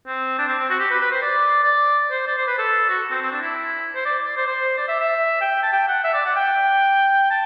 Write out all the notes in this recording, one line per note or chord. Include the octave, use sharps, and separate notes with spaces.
C4
D4
C4
C4
F#4
G4
B4
B4
C5
D5
D5
C5
D5
C5
B4
A4
F#4
C4
C4
D4
E4
C5
D5
D5
C5
C5
D5
E5
E5
G5
A5
G5
F#5
E5
D5
F#5
G5
A5